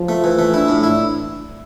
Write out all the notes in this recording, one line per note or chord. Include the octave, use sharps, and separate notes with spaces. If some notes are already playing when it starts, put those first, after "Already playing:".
Already playing: F3
A3
E3
A3
D4 E4
A2
E4